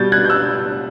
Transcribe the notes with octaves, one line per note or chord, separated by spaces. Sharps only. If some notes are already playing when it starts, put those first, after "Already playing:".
Already playing: B2 G3 G6 A6
F#6 G#6
G6
E6 F#6